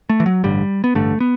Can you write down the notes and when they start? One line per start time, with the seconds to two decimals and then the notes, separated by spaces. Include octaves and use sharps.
0.10 A3
0.20 E3
0.26 F#3
0.44 A1 G2 D3 G3
0.84 B3
0.95 A1 G2 D3 A3
1.20 B3